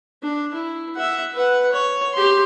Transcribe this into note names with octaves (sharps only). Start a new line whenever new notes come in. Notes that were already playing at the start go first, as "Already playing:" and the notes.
D4
E4
E5 F#5
B4 F#5
C#5
G4 C6